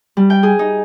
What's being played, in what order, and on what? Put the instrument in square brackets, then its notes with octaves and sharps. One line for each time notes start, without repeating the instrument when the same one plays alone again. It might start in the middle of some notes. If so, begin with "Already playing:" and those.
[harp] G3
G5
G#4
D#4